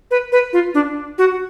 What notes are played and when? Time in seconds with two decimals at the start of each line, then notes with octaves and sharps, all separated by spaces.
0.11 B4
0.32 B4
0.53 F4
0.74 D4
1.18 F#4